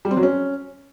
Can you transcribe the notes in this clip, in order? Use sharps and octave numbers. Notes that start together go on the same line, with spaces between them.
G3
C4
F#3
C#4